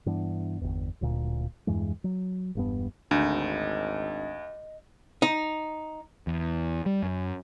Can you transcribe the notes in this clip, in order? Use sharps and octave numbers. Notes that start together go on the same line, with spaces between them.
G2 E3 B3 D4
G1 E2
D1 D2 A#2
E2 G2 E3 G#3
F#3
E1 G2 B3
G#1 D2 D4 D#5
D#4
E2
G3
F#2